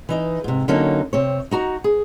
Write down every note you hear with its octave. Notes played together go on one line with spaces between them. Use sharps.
E3 D#4 D#5
G#2 C3
D3 F#3 A#3 C#4 D#4
C3 C4 C#5
D#4 F#4 A#5
G#4